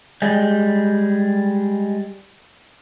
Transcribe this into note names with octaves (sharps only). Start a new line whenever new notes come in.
G3 G#3